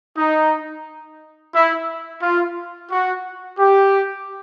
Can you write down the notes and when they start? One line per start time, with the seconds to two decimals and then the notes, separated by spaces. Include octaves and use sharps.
0.18 D#4
1.55 E4
2.22 F4
2.91 F#4
3.59 G4